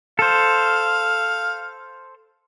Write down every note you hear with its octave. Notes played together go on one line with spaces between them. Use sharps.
A4 C5 F5